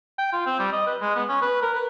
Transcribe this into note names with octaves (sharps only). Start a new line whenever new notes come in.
G5
F4
C4
G3
D#5
B4
G#3
B3
C#4
B4
A#4
B4